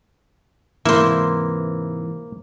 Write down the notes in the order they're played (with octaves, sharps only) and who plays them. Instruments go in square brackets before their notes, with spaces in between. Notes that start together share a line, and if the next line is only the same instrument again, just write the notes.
[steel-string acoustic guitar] G#2 C3 E3 [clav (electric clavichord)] A#3 [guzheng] E4 C5